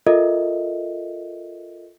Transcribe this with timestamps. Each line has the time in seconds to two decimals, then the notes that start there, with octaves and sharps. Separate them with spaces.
0.07 F4 A4 A#4 D#5 E5